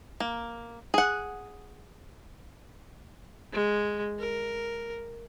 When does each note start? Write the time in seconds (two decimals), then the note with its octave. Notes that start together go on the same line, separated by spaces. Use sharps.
0.20 A#3
0.94 G#4 F#5
3.53 G#3
4.19 A#4